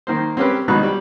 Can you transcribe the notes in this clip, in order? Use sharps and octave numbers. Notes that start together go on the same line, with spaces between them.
D#3 A#3 C5
C4 C#4 G4 A#4 B4
G#1 B2 B3 D#4 C#6 F#6
G3